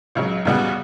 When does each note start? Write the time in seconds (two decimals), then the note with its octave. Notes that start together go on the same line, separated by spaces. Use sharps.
0.15 C#2 C#3 F#3
0.45 E2 C#3 G3 B3 F#4